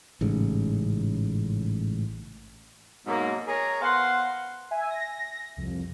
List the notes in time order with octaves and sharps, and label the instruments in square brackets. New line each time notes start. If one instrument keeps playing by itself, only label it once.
[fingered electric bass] A1 G#2 C#3
[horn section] G#2 B2 F#3 A#3
G#4 A#4 C#5 A#5
B3 C5 F5 F#5 C6
[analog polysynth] E5 G#5
A#6
C2 F2